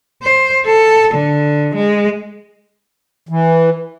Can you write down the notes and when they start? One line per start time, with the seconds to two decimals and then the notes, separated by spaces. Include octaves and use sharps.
0.22 C5
0.66 A4
1.14 D3
1.75 G#3
3.29 E3